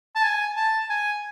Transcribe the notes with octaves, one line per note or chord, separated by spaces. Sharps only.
A5
G#5
A5
G#5